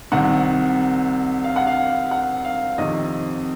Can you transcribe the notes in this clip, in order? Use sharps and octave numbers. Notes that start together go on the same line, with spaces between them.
C2 C3 D#3 F#5
F5
F#5
F5
F#5
F5
F2 C3 D#3 D#5